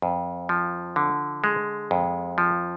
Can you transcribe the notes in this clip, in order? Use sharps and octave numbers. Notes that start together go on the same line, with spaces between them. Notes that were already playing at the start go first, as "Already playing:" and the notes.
F2
F3
D3
G#3
F2
F3